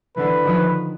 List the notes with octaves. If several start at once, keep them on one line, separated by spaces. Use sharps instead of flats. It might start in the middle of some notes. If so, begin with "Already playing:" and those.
D3 E3 B4
D#3 F3